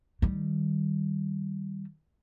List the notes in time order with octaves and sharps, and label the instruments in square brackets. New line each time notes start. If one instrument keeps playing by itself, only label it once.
[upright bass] D#3 G3